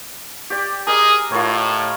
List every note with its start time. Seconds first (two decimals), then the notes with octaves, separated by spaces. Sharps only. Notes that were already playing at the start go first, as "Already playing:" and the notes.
0.50 G4 D5
0.87 G#4 A#4 D#5
1.32 A2 F4 A#4 C#5